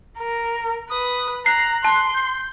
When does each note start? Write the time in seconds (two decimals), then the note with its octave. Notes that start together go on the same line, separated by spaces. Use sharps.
0.19 A#4
0.90 B4 D#6
1.46 A#5 F#6 C7
1.85 A5 C6
2.14 G6